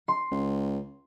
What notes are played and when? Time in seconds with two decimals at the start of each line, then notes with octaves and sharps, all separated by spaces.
0.08 C6
0.32 C#2